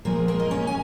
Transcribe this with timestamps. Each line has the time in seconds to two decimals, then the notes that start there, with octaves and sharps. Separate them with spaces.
0.05 A#2 F3 G#3 A#3 A#4
0.28 A#3 A#4
0.40 D#5
0.51 C#4 C#5
0.67 G#5